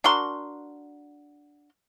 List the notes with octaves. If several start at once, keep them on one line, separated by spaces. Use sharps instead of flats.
D4 F#4 A#4 C6